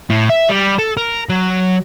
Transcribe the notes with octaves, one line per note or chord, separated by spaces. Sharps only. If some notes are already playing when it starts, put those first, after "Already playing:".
A2
E5
G3
A4
A#4
F#3